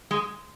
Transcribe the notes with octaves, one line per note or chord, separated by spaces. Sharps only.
G#3